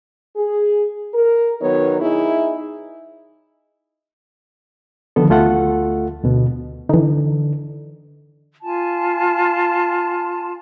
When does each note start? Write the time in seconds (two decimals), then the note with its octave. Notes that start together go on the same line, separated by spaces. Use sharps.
0.37 G#4
1.14 A#4
1.62 D#3 F#3 B3 D#4 B4 C#5
2.01 D#4 E4 G#4
5.16 D3 D#3 F3 B3 A4
5.29 D2 A3 F4 A4 F#5
6.23 D2 B2
6.89 D3 E3 D#4
8.63 F4 G#5 A5